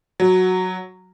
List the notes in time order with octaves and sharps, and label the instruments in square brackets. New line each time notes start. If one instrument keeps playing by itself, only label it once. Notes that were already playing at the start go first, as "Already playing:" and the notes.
[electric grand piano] F#3